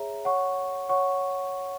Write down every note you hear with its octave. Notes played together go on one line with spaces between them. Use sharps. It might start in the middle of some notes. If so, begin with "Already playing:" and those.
Already playing: G#4 C#5 E5 A#5
C#5 F#5 C#6
C#5 F#5 C#6